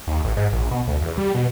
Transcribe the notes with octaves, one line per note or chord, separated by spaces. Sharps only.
D#2
A1
G#2
A#1
B2
D2
E2
G3
B2